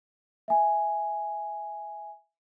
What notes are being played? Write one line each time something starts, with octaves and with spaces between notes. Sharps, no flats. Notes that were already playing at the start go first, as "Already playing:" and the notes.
E5 G#5